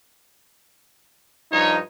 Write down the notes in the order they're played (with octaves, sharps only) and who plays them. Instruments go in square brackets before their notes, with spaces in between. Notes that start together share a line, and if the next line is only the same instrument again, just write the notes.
[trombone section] G2 F3 D#4 [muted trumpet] C#5